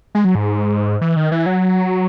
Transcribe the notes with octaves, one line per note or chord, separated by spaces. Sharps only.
G#3
F#3
G#2
E3
D#3
E3
F#3